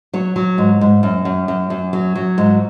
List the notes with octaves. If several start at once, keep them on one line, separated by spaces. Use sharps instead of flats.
F#3 C#5
F#3
G#2
G#2
F#2
F#2
F#2
F#2
F#3
F#3
G#2